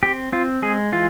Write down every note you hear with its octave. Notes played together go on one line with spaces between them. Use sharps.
C4 G4
C4 F4
G#3 G#4
E3 F4